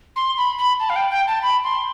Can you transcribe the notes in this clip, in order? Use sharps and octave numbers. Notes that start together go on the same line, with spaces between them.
C6
B5
B5
A5
F5
G5
G5
A5
B5
C6